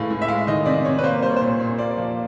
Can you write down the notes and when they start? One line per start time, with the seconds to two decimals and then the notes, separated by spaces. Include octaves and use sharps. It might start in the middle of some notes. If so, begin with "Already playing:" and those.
Already playing: A2 E3 G#3 F5
0.11 A2
0.22 E5
0.28 G#3 F5
0.47 D#3 D#5
0.66 C3 D5
0.85 C3 C#5
0.99 B4
1.04 A#3 C5
1.23 G3 C5
1.30 C#5
1.36 A#2 C5
1.59 A#2
1.79 A#3 D5
1.91 D5
1.97 F3
2.04 D5